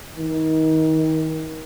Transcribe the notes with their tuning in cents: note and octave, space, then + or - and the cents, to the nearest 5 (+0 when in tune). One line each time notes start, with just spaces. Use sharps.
D#3 +30